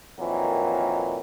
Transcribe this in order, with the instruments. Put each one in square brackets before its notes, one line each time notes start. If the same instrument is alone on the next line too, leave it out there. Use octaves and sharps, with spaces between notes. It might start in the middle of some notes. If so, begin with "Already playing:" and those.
[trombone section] F2 A#2 D#3 E3 F#3